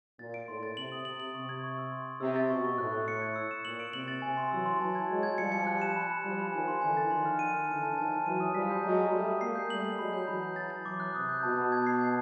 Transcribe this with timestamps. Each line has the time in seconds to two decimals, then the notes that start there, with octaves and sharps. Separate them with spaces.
0.19 A#2 A6
0.34 D7
0.48 A2 C6
0.63 A6
0.77 C3 F#7
0.92 D#6
1.05 C3 F#7
1.20 F#7
1.34 C3 C#6
1.49 G#6
1.64 C#6
1.78 E6
1.92 C6
2.06 C6
2.20 C3 E6
2.36 A6
2.49 B2 C#6
2.64 C#6
2.78 A2 F#6
2.93 C#6
3.08 C#7
3.22 G#6
3.36 E6
3.51 E7
3.65 A#2 F#7
3.80 D7
3.93 C3 F#7
4.08 A6
4.22 C3 G#5
4.37 C6
4.51 E3 F#3 E6
4.66 C6
4.80 E3 F#3 A5
4.95 G#6
5.09 F#3 G#3 A5
5.23 G#6
5.38 F3 G3 C#7
5.52 C#7
5.67 F#6
5.82 E7
5.96 B5
6.10 B5
6.24 F3 G3 B5
6.39 B5
6.53 D#3 F3 G#5
6.68 C6
6.82 D3 E3 G#5
6.97 A6
7.10 D#3 F3 C6
7.26 F6
7.39 D#7
7.54 F6
7.68 D3 E3 A5
7.83 A5
7.97 D#3 F3 A5
8.11 A5
8.25 E3 F#3 D#7
8.40 D#6
8.54 F3 G3 B6
8.70 G6
8.83 F#3 G#3 A#5
8.98 A#5
9.12 G3 A3 A#5
9.27 D#6
9.41 G#3 A#3 C7
9.55 G6
9.70 G3 A3 F#7
9.85 C7
9.99 F#3 G#3 B5
10.13 G6
10.27 E3 F#3 B5
10.43 G6
10.56 A6
10.70 A6
10.85 E3 F#3 D6
11.00 F#6
11.14 C3 D#6
11.29 G6
11.43 B2 A5
11.57 A5
11.72 G#6
11.87 C7
12.01 G#6